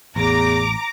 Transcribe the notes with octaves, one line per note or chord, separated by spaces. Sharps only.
A1 E2 A#5 D6